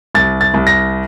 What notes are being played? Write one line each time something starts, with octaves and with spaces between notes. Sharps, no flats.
C2 A6
A6
C2
A#6